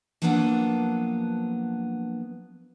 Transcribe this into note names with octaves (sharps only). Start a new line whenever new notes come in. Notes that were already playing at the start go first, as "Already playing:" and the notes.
F3 F#3 A#3 B3 D4 F#5